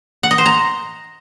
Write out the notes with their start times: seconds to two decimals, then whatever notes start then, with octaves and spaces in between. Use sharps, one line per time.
0.23 F#5
0.31 D#5
0.38 C5
0.46 A#5